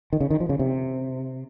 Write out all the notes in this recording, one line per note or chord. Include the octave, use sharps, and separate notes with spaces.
D#3
C#3
D#3
F3
C#3
C3